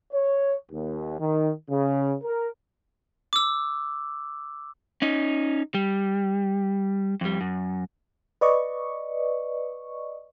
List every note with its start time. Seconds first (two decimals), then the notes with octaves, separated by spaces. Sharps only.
0.14 C#5
0.71 D#2
1.19 D#3
1.70 C#3
2.24 A#4
3.33 D6 E6
5.02 C#4 D#4
5.74 G3
7.21 F2 G3
7.41 F#2
8.41 B4 D5 D#5 C#6